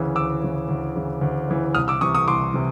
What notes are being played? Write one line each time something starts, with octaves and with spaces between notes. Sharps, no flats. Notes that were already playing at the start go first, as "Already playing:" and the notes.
Already playing: D2 C#3 E3
D2 D6 E6
C#3 E3
D2
C#3 E3
D2
C#3 E3
C2 D#6 F6
D6 E6
C3 E3 C#6 D#6
C#6 D#6
C2 C6 D6
C3 E3